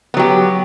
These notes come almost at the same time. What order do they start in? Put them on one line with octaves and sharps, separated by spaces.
B3 F#3 G4